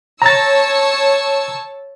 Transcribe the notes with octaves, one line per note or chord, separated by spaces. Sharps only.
C#5 A5 A#5 E6 A6